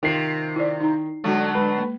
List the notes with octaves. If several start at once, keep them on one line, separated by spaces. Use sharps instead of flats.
C3 D#3 F4 C7
E4 C5 D5
D#4 A#5
D3 F#3 G#3 A3 F#4
G#3 B4
A#3